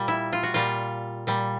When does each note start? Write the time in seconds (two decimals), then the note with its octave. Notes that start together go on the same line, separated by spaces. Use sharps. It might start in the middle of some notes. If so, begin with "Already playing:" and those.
Already playing: A#2 G3
0.08 E4
0.33 F4
0.43 F#4
0.54 A#2 G3 F4
1.27 A#2 G3